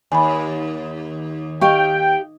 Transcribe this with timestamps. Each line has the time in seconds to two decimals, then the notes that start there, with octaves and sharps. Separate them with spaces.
0.12 D#2 G#5 B5
1.61 G4 D#5 F5 G5 C#6